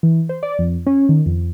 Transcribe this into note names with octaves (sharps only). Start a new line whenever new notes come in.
E3
C5
D5
F2
C#4
D#3
F2